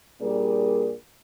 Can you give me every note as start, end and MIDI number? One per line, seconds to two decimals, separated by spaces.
0.21 0.93 46
0.21 0.93 55
0.21 0.93 62
0.21 0.93 68
0.21 0.93 70